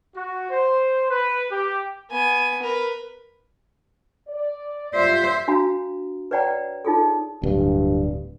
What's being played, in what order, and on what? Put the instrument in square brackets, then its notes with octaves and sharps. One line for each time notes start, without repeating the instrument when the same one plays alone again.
[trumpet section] F#4
C5
B4
G4
[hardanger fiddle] B3 G#5
A#4 B4
[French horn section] D5
[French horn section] G3 F4 [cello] C5 E5
[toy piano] D4 F#4 F5 A#5
B4 C#5 D5 F#5 G5 A#5
D#4 F4 G#4 A4
[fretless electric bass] D1 [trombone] G2